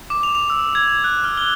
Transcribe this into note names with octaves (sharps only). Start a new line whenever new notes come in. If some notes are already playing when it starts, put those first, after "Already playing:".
D6
F7
F7
E6
G#6
F#6
F6
G7